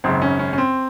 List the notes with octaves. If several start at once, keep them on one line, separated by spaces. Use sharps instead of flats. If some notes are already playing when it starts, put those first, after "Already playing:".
G#1 F#2 C#3 C4
C#4
C#4
C#4
C4